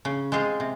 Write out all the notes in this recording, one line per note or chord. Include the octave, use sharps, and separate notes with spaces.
C#3
G#3 C4 F4 G#4
C3